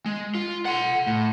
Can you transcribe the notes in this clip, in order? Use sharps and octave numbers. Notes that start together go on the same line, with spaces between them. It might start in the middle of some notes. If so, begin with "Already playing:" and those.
G#3
F4
F#5 C6
A2